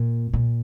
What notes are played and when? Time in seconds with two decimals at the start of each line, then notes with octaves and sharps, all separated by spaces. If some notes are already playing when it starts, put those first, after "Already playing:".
Already playing: A#2
0.33 A#2